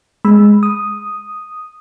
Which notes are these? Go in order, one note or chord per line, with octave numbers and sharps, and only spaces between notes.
G#3 B5 E6
D#6